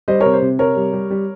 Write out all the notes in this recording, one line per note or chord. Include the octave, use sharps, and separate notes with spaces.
G3 C5 D#5
C3 A#4 C#5
C5
C3
C3 A#4 C#5
G3
G3
G3